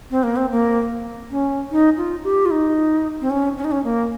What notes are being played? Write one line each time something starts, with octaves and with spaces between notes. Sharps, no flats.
C4
A#3
C4
A#3
C#4
D#4
F4
G4
F4
D#4
C4
C#4
C#4
D#4
C#4
A#3